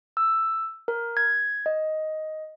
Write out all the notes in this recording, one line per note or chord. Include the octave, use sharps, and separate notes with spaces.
E6
A#4
G#6
D#5